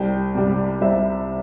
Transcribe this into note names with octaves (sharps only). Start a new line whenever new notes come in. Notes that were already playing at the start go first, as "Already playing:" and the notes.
Already playing: C2 G5
C3 G3
C2 E5